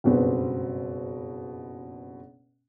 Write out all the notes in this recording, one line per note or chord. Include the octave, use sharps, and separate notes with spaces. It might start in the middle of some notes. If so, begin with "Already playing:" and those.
F#1 G2 B2 C4 B4